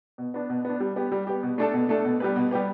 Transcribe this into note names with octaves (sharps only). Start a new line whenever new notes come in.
B2
B3 D4
B2
B3 D4
G3
B3 G4
G3
B3 G4
B2
A3 D4 A4
B2
A3 D4 A4
B2
G3 B3 G4 B4
B2
G3 B3 G4 B4